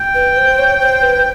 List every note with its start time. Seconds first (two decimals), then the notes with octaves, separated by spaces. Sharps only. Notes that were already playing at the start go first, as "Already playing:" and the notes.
Already playing: G5
0.14 B4
0.37 C5
0.59 C#5
0.80 C5
1.02 B4